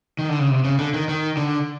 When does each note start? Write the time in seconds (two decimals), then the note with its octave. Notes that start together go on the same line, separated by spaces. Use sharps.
0.19 D#3
0.29 D3
0.39 C#3
0.50 C3
0.65 C#3
0.79 D3
0.94 D#3
1.09 D#3
1.37 D3